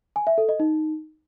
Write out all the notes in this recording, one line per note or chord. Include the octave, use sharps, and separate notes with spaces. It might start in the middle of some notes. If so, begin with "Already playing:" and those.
G#5
E5
A4
D#5
D#4